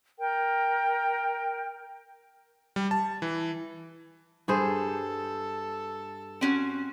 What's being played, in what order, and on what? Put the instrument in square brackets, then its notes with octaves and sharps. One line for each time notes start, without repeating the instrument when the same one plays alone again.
[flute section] A#4 G5
[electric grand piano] G3
A5
E3
[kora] G2 G#4 C5 [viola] A4
[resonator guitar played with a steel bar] C4 C#4 F#4